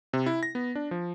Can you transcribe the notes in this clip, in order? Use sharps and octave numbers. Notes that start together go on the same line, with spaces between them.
C3
E4
A#6
B3
D4
F3